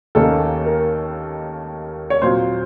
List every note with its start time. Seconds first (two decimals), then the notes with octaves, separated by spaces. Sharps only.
0.15 D#2 D#3 A#3 C#4 A4
0.66 A#4
2.10 C#5
2.22 A#2 F#3 C4 C5